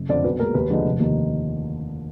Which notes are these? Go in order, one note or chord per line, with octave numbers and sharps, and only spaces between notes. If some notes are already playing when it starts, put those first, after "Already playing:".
Already playing: F#1
F2 D3 F3 D5
B1 B4
A#2 G#3 A#4
D#2 B4
D3 F3 G#3 D#4
F1
D#2 D#3 A#3 D#4